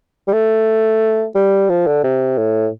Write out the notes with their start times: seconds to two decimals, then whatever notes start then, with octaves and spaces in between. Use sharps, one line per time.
0.28 G3
0.33 A3
1.35 G3
1.70 F3
1.87 D3
2.04 C3
2.38 A2